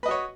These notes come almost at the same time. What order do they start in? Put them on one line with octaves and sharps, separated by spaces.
B4 D#5 F#4 C#5